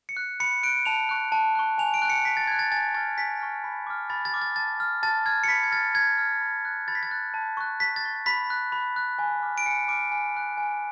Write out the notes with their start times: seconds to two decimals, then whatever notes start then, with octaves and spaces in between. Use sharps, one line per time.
0.09 C#7
0.17 F#6
0.40 B5 C#7
0.63 F#6 D7
0.86 A5 F7
1.09 C#6 F#6
1.32 A5
1.55 C#6 F#6
1.78 G#5 F7
1.94 D7
2.02 C#6 F#6
2.10 C#7
2.25 G#5 B6
2.37 A6
2.47 C#6 F#6 G#6
2.59 A6
2.71 G#5 A6
2.94 C#6 F6 A6
3.17 G#5 B6
3.40 C#6 F6
3.64 B5
3.87 D6 F6
4.10 B5 A6
4.25 A6
4.34 D6 F6
4.42 A6
4.56 A5 A6
4.80 F6
5.03 A5 A6
5.26 F6 G#6
5.44 C#7
5.48 B5 B6
5.63 G#6
5.71 F6 A6
5.95 B5 G#6
6.18 F6
6.41 B5
6.65 F#6
6.88 B5 A6
6.95 B6
7.03 A6
7.11 F#6
7.34 A5
7.57 C#6 F#6
7.80 A5 B6
7.96 A6
8.04 C#6 F#6
8.26 B5 B6
8.50 F#6
8.72 B5
8.96 F#6
9.19 G#5
9.42 D6 F6
9.58 D7
9.66 G#5 C#7
9.88 D6 F6 D7
10.11 G#5
10.35 B5 F#6
10.57 G#5